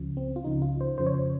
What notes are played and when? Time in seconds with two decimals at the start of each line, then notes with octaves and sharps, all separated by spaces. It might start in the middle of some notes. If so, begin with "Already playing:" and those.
Already playing: C#2 C#3 F3
0.17 C4
0.36 F4
0.44 C#2 C#3 F3 D#4
0.62 F4
0.81 C5
0.98 F2 C#3 F3 C5
1.07 C#5
1.14 C5